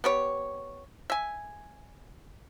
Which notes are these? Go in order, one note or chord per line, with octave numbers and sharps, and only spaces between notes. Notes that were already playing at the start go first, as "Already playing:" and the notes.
B3 G4 C#5
E5 G#5